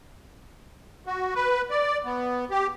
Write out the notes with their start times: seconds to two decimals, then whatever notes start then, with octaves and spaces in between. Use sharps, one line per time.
1.06 F#4
1.35 B4
1.70 D5
2.05 B3
2.51 G4